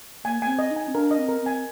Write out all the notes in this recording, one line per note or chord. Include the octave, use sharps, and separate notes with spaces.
A#3 G#5
A#3 C4 G#5
D#5
D#4
G#5
C4
D4 A#4
D#5
C4
A#4
C4
G#5